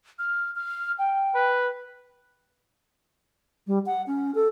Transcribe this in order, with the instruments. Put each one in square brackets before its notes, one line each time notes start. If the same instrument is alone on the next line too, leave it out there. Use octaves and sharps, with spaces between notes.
[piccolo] F6
F6
G5
[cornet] B4
[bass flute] G3
F#5
C#4
A4